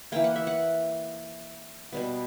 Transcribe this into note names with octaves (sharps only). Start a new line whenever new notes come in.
E3 A#3 G5
F#5
E5
F#5
B2 G3 B3